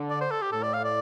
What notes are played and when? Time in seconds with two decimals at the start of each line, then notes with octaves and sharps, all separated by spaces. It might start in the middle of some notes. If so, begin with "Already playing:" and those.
Already playing: D3
0.10 D5
0.21 C5
0.31 A4
0.42 G4
0.52 A2 A4
0.63 D5
0.73 F5
0.84 D5